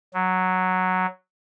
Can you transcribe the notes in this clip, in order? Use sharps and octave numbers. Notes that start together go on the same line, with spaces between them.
F#3